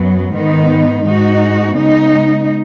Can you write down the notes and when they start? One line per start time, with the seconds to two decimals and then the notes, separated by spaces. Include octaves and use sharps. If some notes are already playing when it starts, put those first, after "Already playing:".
Already playing: F#2 F#3 B3
0.32 G#2 D#3 B3 D#4
1.05 G#2 G#3 D#4 F#4
1.76 C#3 G#3 B3 D#4